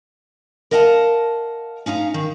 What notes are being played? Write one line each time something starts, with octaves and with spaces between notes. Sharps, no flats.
A#4 D#5 F5 F#5 G#5 A5
C#4 D#4 F5 A#5
D#3